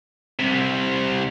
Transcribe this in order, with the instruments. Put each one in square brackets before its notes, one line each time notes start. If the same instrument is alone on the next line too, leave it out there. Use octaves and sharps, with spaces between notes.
[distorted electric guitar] C2 C3